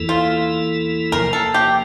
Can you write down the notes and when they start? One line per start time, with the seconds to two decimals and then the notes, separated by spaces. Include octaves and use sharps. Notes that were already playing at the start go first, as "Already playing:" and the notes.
Already playing: E2 E3 A#3 E4 A4
0.09 F4
1.12 C3 F3 A#3 A#4
1.33 A4
1.54 G4